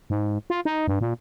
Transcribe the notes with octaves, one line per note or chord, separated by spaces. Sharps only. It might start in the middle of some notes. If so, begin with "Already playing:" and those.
G#2
F4
D#4
G2
A#2